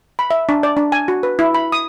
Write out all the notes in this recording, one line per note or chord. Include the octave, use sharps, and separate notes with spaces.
B5
E5
D4
D5
D4
G#5
F#4
B4
E4
B5
D#6